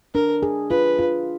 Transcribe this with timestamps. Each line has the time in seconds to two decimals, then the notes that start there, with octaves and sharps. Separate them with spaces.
0.14 D4 A#4
0.43 G#4
0.70 F4 B4
0.99 F4